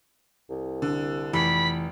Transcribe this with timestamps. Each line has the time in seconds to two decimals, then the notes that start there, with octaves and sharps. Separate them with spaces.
0.50 C2
0.82 D3
1.33 F1 E3 B5